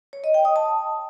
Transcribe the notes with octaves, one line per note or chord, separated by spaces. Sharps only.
C#5
D#5
G5
D#6
A5